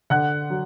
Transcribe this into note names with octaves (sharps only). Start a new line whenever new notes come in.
D3 F#5 F#6
F#3